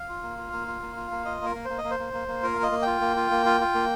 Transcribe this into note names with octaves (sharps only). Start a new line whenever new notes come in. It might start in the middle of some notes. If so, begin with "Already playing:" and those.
Already playing: F5
F4
A#3
F4
A#3
F4
A#3
F4
A#3
F4 D#5
A#3 A#4
A#3
A#3 C5
D#5
A#3
C5
A#3
A#3
A#3
F4 A#4
A#3 F5
D#5
A#3
F4 G5
A#3
F4
A#3
F4
F4
A#3